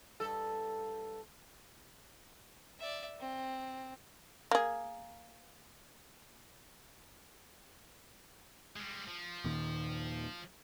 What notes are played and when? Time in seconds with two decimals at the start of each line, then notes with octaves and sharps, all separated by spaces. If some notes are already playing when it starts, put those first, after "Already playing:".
0.20 G2 A4
2.79 D5 E5
3.20 C4
4.51 A#3 G#4
8.76 G3 G#3
9.08 F3
9.44 D#2 A#2 D#3